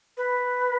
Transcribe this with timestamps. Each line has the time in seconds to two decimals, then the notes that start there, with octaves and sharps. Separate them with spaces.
0.17 B4